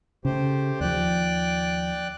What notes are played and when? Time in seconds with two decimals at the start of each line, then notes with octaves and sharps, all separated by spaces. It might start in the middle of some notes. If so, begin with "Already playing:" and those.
0.25 C#3 A3 G4 C5
0.80 D#2 F3 D5 G5 F#6